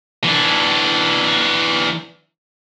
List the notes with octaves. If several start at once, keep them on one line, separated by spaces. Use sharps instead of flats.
E3 D4